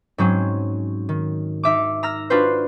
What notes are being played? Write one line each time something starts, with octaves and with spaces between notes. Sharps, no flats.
G#2 F#3 C4 C#4
D#3
D#4 E5 D6
A#5 E6 F6 A#6
D4 F4 F#4 B4 C5